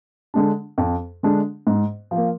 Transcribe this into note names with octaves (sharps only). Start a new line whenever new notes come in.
D3 G#3 D4
F2
D3 G#3 D4
G#2
F3 A#3